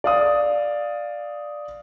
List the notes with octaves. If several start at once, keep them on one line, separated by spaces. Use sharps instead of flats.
D5 F5 D#6